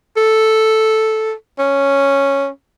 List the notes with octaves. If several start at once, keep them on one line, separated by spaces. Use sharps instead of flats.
A4
C#4